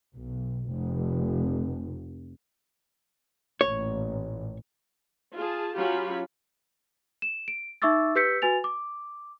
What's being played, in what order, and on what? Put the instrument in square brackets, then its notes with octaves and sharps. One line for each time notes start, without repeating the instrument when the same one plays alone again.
[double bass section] B1
F1
[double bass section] A1 A#2 [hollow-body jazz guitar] C#5
[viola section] F4 G#4 A5
F#3 C#4 F4 G4 B5
[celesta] E7
D7
D#4 E5 C#6 D6 E6 A6
G4 B4 E6 G6 B6 C#7
F#4 B4 G#5 A6 F7
D6